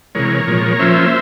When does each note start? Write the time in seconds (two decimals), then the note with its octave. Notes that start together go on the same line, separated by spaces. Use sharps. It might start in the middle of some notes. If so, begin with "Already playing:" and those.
0.15 C3 E3 G#3 A#4 C#5
0.47 A#2 F3 G#3
0.79 F3 A#3 C#4 C5 E5